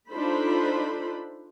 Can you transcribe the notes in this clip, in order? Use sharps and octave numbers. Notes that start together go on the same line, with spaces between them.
D4 D#4 F4 A4 C5 B5